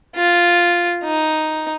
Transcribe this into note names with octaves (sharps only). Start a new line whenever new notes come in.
F4
D#4